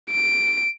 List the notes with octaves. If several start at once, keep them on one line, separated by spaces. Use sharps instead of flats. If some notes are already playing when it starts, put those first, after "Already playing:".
D7